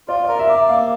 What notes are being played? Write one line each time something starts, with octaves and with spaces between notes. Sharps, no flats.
F4 D5
D5
A#4
E5
D5
E5
A#3 F5